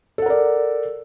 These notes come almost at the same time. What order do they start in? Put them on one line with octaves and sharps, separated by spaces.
A4 F#5 A#4 D5